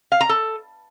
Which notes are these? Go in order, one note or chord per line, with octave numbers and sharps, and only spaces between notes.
F5
A#5
A4